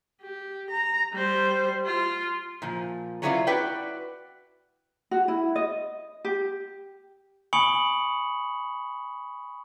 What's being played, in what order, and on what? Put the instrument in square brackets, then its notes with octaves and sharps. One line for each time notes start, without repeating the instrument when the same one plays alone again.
[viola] G4
A#5
G3 C5
F4
[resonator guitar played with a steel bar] A#2 F3
F#3 B3 C#4 E4 F4 D5
E4 F#4 B4 D5 G5
[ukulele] F#4
E4
D#5
G4
[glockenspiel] G#5 B5 C#6 D#6 C#7 F#7